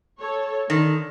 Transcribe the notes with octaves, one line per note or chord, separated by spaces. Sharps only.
A4 C#5
D3 D#3